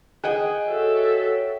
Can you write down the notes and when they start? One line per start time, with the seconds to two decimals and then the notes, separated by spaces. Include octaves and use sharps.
0.24 G#4 D#5 F#5 G5 F#6
0.68 F#4 A4 C#5 E5